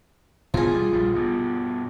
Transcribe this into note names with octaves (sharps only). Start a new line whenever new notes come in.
B2 D3 E3 F4 G#4
G3
A#1 G3
G2 B2